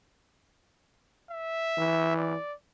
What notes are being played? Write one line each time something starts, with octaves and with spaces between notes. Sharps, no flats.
E5
E3
D5